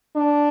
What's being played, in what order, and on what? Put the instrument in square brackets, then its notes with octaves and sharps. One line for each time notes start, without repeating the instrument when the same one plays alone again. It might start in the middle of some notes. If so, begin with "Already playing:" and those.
[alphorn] D4